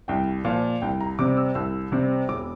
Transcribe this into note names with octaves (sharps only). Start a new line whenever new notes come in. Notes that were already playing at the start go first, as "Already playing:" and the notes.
C2 G5
A#2 F3 F5
C2 G5
A#5
C3 G3 C4 D6
E6
C2 E6
C3 G3 C4
E1 D6